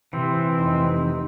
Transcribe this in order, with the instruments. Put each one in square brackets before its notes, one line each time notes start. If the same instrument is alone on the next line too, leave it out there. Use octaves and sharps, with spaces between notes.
[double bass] C3 [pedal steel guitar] E3 [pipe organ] C4
[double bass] F1 D#4